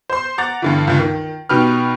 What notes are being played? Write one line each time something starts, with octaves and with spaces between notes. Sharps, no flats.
C5 C6
F#5 A#5 D6 A6
G2 D3 E3
C#2 G2
D#3
B2 D#4 G4 B4 F6